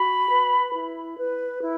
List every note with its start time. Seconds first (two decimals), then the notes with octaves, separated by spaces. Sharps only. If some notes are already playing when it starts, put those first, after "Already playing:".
Already playing: F#4 B5
0.28 B4
0.72 E4
1.16 B4
1.60 E4